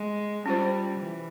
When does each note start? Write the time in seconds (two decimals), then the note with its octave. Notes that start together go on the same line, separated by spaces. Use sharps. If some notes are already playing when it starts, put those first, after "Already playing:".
Already playing: G#3
0.46 G3 C#4 F4 C5
0.99 E3